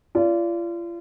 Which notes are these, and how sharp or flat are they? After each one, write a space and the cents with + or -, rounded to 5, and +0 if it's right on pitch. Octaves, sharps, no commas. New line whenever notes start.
F4 -35 D5 -25